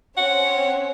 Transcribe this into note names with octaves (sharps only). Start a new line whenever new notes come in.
C4 C#4 C#5 F#5